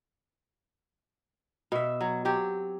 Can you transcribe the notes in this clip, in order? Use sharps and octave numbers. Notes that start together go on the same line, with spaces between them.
B2 E5
F#3
F#3 C4 G4